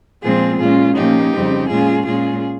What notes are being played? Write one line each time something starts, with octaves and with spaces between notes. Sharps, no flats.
A#2 F3 G#3 C4 F4 G#4
A#2 G#3 C#4 F4
A#2 F3 A#3 C#4 D#4 G4
F2 C#3 G3 C4
A#2 G#3 C#4 F4 G#4
A#2 G#3 C#4 F4 G#4